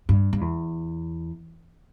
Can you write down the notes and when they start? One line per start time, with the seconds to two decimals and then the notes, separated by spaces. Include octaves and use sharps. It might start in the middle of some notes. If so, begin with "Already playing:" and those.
0.09 G2
0.33 G2
0.41 E2